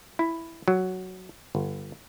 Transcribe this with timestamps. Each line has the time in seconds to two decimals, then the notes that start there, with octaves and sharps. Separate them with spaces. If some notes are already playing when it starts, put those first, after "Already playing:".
0.19 E4
0.68 F#3
1.55 G1